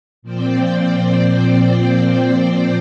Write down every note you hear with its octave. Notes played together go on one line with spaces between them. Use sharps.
A#2 F3 C4 C5 D5 G5